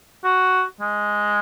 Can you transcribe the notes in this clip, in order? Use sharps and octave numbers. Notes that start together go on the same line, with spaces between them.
F#4
G#3